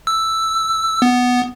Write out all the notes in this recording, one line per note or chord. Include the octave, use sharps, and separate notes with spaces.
E6
B3